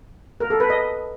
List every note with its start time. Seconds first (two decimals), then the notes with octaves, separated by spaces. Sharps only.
0.40 A#4
0.50 A4
0.60 B4
0.70 D#5